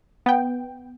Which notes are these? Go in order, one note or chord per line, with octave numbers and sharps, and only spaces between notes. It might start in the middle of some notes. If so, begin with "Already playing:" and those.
B3 G5